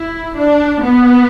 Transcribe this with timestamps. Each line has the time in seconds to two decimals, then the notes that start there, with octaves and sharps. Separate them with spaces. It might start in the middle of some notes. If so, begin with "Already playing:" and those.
Already playing: E4
0.35 D4
0.81 B3